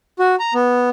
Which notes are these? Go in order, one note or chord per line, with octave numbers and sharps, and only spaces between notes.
F#4
A#5
B3